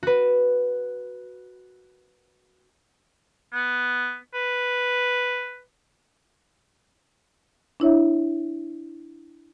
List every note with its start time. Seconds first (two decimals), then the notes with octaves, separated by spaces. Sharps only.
0.03 F#4 B4
3.53 B3
4.34 B4
7.80 D4 E4 C#5 E5